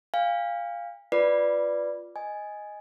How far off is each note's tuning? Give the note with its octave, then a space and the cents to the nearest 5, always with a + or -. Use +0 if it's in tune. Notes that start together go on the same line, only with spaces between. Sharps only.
F5 +0 G#5 -45
F4 +0 B4 +0 D5 +0
D#5 +0 G#5 +0